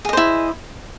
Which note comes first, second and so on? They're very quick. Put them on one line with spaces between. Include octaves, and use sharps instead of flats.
G#4 D#5 C5 E4